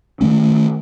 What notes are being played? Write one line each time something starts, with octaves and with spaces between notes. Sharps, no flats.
D#3 F#3 A3 C#4